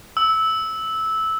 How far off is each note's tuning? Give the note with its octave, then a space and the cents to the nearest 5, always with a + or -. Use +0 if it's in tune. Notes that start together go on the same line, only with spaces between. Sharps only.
E6 -15